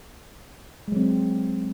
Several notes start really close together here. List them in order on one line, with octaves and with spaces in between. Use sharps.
G#3 F#3 C4